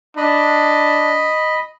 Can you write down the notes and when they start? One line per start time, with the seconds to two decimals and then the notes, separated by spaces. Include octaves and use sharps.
0.17 D4 D#5 B5